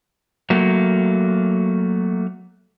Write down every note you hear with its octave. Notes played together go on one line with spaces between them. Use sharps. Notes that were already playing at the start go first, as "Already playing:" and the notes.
F#3 A3 A#3